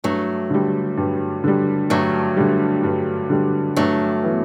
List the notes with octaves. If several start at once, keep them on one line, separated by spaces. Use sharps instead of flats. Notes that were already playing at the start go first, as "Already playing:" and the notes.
G2 F#3 A3
D3 G3
G2
D3 G3
G2 F#3 A3
D3 G3
G2
D3 G3
G2 F#3 A3
E3 B3